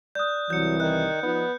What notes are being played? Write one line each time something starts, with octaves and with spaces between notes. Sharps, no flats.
D5 D#6 F#6 G6
C2 E3 F#3 G6 C#7
D#3 F#6
F3 B3 D#4